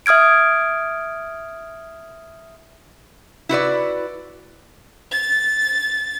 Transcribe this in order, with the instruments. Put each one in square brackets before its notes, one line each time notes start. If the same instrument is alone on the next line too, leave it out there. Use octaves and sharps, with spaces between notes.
[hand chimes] E5 D#6 F6 G#6 D7
[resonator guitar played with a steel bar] E4 F#4 B4 D5
[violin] A6